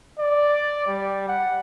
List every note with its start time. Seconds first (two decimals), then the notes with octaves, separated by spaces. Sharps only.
0.20 D5
0.87 G3
1.28 F#5